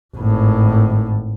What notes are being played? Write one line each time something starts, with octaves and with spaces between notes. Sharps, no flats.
G#1 A2